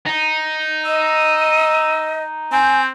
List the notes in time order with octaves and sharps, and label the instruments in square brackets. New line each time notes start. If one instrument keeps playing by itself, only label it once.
[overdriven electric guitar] D#4
[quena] D#5 [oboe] E6
[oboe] C4 [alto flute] G#5 [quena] G6